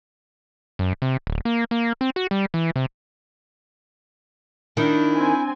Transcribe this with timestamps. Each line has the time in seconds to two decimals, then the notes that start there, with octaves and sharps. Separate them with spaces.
0.79 F#2
1.02 C3
1.27 D1
1.45 A#3
1.71 A#3
2.01 C4
2.16 F#4
2.31 G3
2.54 E3
2.76 C3
4.77 D#3 D4 E4
5.15 C4 G#5